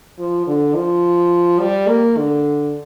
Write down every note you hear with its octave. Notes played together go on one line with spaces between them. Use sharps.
F3
D3
F3
G3
A#3
D3